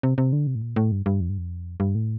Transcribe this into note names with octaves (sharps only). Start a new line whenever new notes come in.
C3
C3
D3
C3
A2
A#2
A2
G2
G2
F2
G2
F2
G2
A2